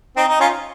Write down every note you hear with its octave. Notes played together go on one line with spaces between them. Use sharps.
C4 D#4
D#4
C#4 F4